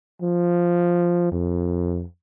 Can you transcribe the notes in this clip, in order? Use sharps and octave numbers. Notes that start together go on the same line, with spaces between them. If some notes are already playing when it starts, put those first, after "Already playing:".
F3
F2